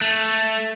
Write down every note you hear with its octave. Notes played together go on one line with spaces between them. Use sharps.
A3